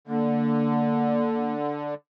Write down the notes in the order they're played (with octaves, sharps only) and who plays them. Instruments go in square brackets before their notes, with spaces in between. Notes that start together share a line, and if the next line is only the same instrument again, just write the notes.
[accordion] D3 [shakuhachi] A#3